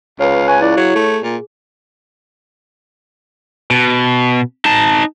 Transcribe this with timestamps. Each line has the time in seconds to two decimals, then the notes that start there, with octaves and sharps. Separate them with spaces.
0.20 C#2 B4 C#5 F5
0.48 F5 G#5 C#6 F#6
0.61 E4 D5
0.77 F#3 G#4 C#5
0.96 A3
1.24 A#2
3.71 B2
4.65 D#4 A5